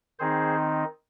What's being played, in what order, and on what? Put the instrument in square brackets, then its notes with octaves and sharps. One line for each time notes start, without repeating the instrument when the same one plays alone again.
[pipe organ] D#3 C4 D#4 G#4 C5